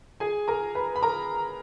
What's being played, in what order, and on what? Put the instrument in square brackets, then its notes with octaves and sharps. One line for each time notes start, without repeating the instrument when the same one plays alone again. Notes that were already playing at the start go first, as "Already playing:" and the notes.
[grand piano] G#4 G#5
A#4 A#5
B4 B5
B5
A#4 A#5